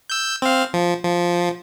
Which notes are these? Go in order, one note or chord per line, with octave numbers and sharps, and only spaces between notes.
E6 G6
C4 F5
F3
F3